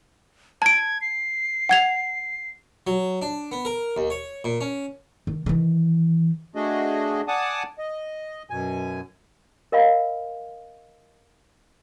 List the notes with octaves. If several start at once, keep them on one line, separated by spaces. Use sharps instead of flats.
A5 G#6 D7
C7
F#5 G#6 F7
F#3
D4
B3
A#4
D#2
C#5
A#2
C#4
D#3
D#3 E3
A3 D4 F#4 G#4 D#5
D5 F#5 G#5 A5 D6 D#6
D#5
F#2 B2 G#5
A#4 D#5 F5 B5